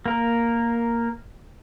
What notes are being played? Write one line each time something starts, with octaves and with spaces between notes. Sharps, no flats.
A#3 A#4